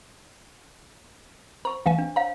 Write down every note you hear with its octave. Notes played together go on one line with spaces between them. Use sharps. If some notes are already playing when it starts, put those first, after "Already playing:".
C5 A#5 C#6
A1 E3 F5 G#5
D4
C5 C#5 F5 A#5